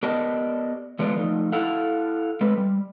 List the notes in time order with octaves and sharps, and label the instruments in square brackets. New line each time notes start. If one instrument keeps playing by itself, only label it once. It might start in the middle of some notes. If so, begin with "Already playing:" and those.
[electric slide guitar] B3 G4 A#4 D5 D#5 A5
E3 G#3 A3 B3 F4 D5
F3 A3 D#4
E4 A4 F5 F#5
G#3 C4 B4
G3